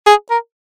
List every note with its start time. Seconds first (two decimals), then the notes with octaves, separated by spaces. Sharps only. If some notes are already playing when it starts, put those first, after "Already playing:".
0.07 G#4
0.31 A#4